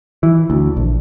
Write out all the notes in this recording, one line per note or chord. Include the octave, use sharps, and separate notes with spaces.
E3
D2
A#1